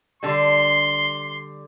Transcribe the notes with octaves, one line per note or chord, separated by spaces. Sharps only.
D3 G3 C6